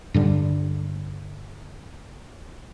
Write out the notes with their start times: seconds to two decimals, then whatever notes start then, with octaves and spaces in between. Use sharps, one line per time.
0.14 G2 D3 G3